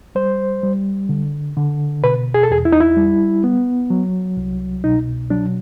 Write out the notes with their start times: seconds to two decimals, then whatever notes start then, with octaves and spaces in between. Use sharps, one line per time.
0.15 G3 C5
0.63 G3
1.09 D3
1.57 D3
2.03 B2 B4
2.34 G#4
2.43 A4
2.50 E2 G#4
2.65 E4
2.72 D#4
2.81 E4
2.97 G3
3.44 B3
3.90 F#3
4.37 C2
4.84 B2 D#4
5.30 F#3 D4